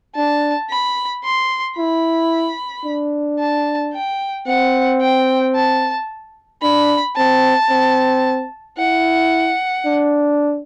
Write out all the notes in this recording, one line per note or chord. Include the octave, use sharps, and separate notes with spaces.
D4 A5
B5
C6
E4 B5
D4
A5
G5
C4 F#5
G5
A5
D4 B5
C4 A5
C4
E4 F#5
D4